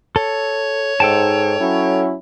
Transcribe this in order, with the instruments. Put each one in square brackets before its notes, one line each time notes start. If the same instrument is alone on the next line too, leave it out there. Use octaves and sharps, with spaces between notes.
[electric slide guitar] A4 [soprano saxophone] C#5
[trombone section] G#2 [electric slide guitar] A4 G5 A5
[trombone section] F#3 C#4 E4